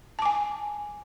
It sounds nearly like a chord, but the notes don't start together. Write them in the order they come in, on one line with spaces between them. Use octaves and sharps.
A5 D6 G#5